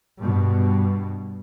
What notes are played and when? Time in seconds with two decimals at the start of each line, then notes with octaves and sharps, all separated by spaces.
0.18 G2 B2